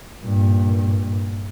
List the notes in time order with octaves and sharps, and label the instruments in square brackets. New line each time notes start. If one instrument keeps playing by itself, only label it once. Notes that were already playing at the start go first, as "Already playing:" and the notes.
[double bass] G2 A#2